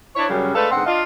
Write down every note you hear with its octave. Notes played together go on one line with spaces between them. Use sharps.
D4 E4 C5 C#5
F#2 C#3 G3
G#3 A3 D4 A4 B4 F5
G#2 D3 B3 C4 F#5
D4 F4 D#5 F5